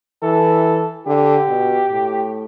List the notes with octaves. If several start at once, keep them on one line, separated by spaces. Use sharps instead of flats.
E3 A4
D3 G4
B2
A2